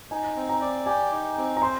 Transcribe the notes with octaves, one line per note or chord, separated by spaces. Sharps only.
D#4 G#5
C4
A#5
D5
G4 G#5
D#4
C4
A#5
C5 C6